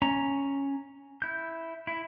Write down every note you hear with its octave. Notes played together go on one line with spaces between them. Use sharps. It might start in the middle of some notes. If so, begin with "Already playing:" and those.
C#4 A#5
E4 G6
E4